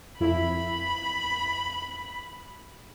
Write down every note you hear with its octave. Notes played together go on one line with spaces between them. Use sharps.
F2 E4 B5